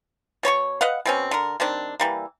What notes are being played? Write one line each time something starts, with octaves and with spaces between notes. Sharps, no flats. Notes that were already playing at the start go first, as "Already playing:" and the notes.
B2 C#5 B5 C#6
B4 D#5 F5 F#5
B2 C4 C#4
D3 A#4
D#3 G3 C4 D4
E3 G3 A#3